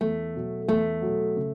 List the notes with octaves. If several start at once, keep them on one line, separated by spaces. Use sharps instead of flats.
E2 A3
B2 F#3
E2 A3
B2 F#3
C#3